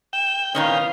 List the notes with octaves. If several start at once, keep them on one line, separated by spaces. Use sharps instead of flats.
G5 E7
A#2 D#3 C#4 B4 F5 D#6